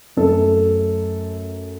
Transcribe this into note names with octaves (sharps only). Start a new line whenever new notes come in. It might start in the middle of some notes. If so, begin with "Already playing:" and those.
F#2 F#3 A3 A4